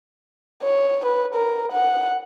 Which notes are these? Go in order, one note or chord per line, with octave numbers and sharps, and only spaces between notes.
C#5
B4
A#4
F#5